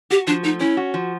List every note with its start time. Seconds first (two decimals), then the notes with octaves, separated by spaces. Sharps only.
0.10 F#4 G4
0.27 F3 D4
0.43 A3 D#4
0.60 C#4 E4
0.77 F#4
0.94 F3